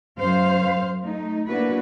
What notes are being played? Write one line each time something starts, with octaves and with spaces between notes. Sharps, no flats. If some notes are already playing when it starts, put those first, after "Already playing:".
F#2 C5 F5
A3 D#4
A#3 B3 D4 E4 F#4 B4